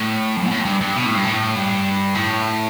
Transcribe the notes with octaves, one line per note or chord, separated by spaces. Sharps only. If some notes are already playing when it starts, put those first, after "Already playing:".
Already playing: A2
F2
B2
A2
F2
G2
G2
B2
A2
G2
A2
G2
A2